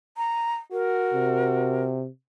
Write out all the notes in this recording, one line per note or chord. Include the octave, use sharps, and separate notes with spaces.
A#5
F#4 A#4
C3